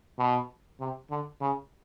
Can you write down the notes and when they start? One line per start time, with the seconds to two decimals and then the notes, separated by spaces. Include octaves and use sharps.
0.18 B2
0.80 C3
1.10 D3
1.41 C#3